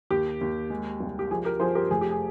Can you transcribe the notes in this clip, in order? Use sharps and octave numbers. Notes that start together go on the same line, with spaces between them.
D#2 G4
D#2
G#3
C2
G4
F3 G#4
G4 A#4
F3 G#4 C5
G4 A#4
F1 G#4
G4
G#4